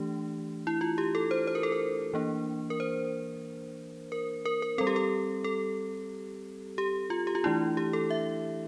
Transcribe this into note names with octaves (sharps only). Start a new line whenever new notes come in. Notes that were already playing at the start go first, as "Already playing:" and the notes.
Already playing: E3 A3 D4 G4
E4
F4
G4
A4
C5
C5
A#4
A4
A#4
E3 A#3 D4
A#4
C5
A#4
A#4
A#4
G3 C4 A4
G4
A4
A4
G4
F4
G4
F4
E3 A3 D4 E4
G4
A4
E5